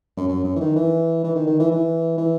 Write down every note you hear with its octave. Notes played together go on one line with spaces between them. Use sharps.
F#2
F#2
F#2
E3
D#3
E3
E3
D#3
D#3
E3
E3
E3